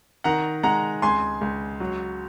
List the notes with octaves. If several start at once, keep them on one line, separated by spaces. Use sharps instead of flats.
D#3 F#5 A#5
G#3 F#5 A#5
C#2 G#5 C6
C#2
F#3